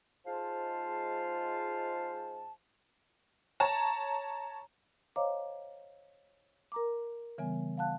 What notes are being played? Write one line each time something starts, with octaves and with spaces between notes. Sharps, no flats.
G#2 G#3 F4 C5 F5 A5
C#5 A5 A#5
C5 C#5 D#5 F5 A#5 D6
A#4 A#5 D6
C#3 E3 G3 B3 G#5
F5 F#5 A5 F#6